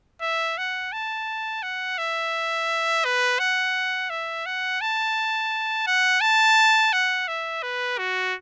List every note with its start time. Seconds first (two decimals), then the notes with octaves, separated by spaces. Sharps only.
0.22 E5
0.58 F#5
0.93 A5
1.63 F#5
1.98 E5
3.05 B4
3.39 F#5
4.10 E5
4.46 F#5
4.81 A5
5.87 F#5
6.21 A5
6.93 F#5
7.28 E5
7.63 B4
7.98 F#4